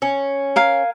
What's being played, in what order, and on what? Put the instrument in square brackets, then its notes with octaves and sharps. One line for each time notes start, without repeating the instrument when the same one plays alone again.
[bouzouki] C#4
[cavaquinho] A#4 F5 G#5